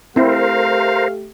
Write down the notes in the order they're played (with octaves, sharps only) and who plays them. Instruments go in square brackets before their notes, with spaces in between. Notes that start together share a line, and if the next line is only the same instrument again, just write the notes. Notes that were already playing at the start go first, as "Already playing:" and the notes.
[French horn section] A3 G4 [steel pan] C4 E4 [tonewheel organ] A#4 C5 [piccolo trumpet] F5